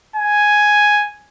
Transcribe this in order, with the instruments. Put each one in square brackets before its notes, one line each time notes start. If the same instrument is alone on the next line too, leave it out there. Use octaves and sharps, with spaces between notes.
[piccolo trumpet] G#5